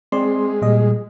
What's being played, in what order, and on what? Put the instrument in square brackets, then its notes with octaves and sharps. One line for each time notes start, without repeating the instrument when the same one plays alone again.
[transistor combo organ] G#3 [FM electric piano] C4 D5 C6
[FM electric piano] A#2 G3 D#5